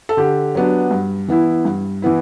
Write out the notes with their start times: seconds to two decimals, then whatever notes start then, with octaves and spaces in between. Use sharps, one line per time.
0.09 A4
0.17 D3 G4
0.55 F#3 B3 D4
0.91 G2
1.28 E3 B3 E4
1.65 G2
2.02 E3 B3 E4